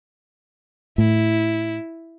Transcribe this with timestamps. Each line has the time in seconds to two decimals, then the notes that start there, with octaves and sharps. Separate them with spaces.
0.98 A2 E4